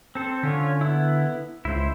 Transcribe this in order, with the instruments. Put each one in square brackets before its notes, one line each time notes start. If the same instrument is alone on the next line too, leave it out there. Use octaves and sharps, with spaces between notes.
[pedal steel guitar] C4 A4 C5
[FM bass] D3 [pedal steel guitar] C#4 F4 C#5
[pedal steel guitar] B3 E4
[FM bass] C#2 [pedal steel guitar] E4 C5